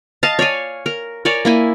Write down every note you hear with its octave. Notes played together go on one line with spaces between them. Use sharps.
D#5 F5 A5
C#5 D5 F5 G#5
A#4
A#4 C#5 D5 G#5
A#3 E4 G#5